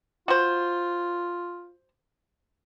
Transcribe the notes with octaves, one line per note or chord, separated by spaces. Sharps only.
F4 F#4 C5